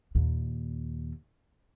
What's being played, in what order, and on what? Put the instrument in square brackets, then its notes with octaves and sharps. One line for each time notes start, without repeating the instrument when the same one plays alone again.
[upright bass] D#2 A#2